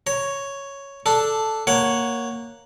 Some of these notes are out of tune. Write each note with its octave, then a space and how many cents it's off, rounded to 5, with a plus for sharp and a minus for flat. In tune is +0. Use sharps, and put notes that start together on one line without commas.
C#5 +0 A#5 +0
D4 +0 A4 +0
A#3 +0 C#5 +0 F#5 +0